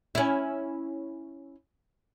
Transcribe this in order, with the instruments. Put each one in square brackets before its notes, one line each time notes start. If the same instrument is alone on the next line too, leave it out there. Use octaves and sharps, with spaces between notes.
[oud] C#4 E4